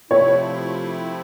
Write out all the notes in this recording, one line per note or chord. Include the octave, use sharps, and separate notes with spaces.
C3 F3 A3 C4 E4 C#5